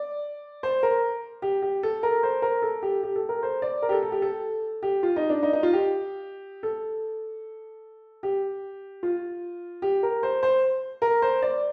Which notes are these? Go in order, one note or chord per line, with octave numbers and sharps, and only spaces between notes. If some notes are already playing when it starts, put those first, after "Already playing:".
Already playing: D5
C5
A#4
G4
G4
A4
A#4
C5
A#4
A4
G4
G4
A4
A#4
C5
D5
A#4
G4
A4
A4
G4
A4
G4
F4
D#4
D4
D#4
D#4
F4
G4
A4
G4
F4
G4
A#4
C5
C5
A#4
C5
D5